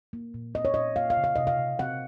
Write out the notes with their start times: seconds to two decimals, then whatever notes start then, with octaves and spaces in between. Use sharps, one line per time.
0.13 A#3
0.34 A#2
0.55 C4 D#5
0.65 C#5
0.74 A#2 D#5
0.96 A#3 F5
1.10 F5
1.17 C#3
1.24 F5
1.36 C3 D#5
1.47 F5
1.59 C3
1.79 C4 F#5